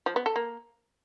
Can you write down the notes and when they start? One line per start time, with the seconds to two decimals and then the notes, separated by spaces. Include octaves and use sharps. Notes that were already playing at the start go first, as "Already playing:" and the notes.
0.06 F3
0.16 B3
0.26 A4
0.36 A#3